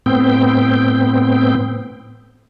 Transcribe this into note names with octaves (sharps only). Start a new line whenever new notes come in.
A2 B3 C4 G5